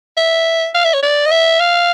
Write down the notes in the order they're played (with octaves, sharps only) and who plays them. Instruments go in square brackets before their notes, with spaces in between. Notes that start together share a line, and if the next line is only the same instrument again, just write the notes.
[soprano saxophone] E5
F5
E5
C#5
D5
D#5
E5
F5